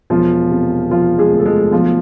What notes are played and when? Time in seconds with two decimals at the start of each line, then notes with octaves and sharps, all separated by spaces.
0.10 E1 F3 F4
0.51 C3
0.91 F3 F4
1.18 G#3 G#4
1.32 D2
1.39 A4
1.45 G#3 G#4
1.72 B1 F3 F4